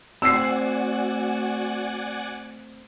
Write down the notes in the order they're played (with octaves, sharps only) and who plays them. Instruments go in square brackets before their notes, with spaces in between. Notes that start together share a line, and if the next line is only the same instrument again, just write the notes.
[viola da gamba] A3 F#4 [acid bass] C4 [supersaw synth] D5 F#5 G#5 [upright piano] E6 C7